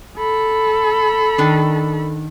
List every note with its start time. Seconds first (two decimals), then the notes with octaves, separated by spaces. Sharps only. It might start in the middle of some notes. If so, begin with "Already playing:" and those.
0.17 A4 B5
1.38 D#3 D4